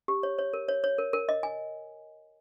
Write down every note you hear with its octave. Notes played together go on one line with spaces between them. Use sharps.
G4
C#5
C#5
A#4
C#5
C#5
A#4
A#4
D#5
G#5